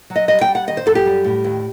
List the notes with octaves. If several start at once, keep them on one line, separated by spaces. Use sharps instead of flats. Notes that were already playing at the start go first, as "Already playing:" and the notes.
F#3
D#5
G3 D#5
G5
G3
F#5
D#3 D#5
C5
F#2 A4
G4
G3
A2
D#2